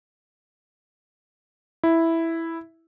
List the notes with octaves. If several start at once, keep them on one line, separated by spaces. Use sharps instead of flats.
E4